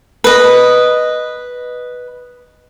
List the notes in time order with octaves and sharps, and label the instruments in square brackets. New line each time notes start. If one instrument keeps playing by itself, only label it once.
[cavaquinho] B4 D#5